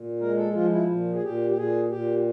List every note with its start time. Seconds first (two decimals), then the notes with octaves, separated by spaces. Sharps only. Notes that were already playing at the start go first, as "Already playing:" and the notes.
Already playing: A#2
0.20 G#3 A#4
0.37 A4
0.54 F3 F4
0.71 E4
0.89 A#2
1.14 G#4
1.23 A#2 G4
1.51 G4
1.56 A#2 G#4
1.91 A#2 G4